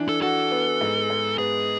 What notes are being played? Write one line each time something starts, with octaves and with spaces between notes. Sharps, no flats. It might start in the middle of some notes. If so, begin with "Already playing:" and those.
Already playing: E3 D4
A4
F#4 A4
B3
G#2
G#3
B3 G#4